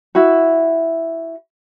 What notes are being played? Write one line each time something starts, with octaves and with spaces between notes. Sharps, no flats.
E4 F#4